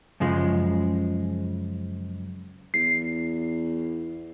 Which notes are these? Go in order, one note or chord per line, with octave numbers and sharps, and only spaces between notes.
F#2 C#3 F3 G#3
E2 C7